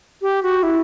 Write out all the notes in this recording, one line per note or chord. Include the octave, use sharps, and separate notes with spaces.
G4
F#4
E4